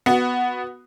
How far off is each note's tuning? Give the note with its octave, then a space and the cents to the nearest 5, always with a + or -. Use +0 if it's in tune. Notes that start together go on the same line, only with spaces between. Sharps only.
B3 +0 F#4 +0